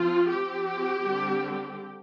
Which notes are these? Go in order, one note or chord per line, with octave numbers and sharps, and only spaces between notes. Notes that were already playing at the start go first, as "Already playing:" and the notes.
Already playing: F3 C4 F4
F3 C4 G4
D3 G3 C4